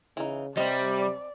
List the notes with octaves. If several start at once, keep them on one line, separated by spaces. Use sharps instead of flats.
C#3 E3 D#4
C3 G3 C4 D5 D#5